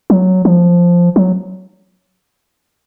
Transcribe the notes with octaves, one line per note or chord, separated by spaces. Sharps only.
F#3
F3
F#3